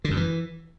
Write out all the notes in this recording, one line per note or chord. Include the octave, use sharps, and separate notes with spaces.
D3
F#2
E3